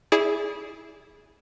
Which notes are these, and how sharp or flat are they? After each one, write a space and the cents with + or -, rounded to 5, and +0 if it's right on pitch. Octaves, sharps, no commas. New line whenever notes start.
E4 -15 G#4 +0 D5 -20